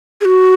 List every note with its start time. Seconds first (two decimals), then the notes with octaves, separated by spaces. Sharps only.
0.21 G#4
0.25 F#4